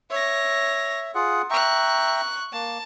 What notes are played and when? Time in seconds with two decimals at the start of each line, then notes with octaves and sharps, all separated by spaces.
0.10 C#5 E5 A#6
1.15 F4 G#4 F#5
1.50 E5 G5 A#5 C#6 F#6
2.53 A#3 A5